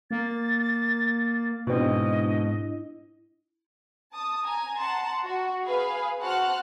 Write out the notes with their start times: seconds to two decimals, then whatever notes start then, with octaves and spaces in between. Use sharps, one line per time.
0.11 A#3 A6
1.67 G#2 B2 C4 D4 E4 D#5
4.13 A5 D#6
4.46 G#5 A#5
4.77 F#5 A5 A#5 C6
5.25 F#4
5.67 G#4 B4 F5
6.22 F#4 C5 F#5 A5 F6 F#6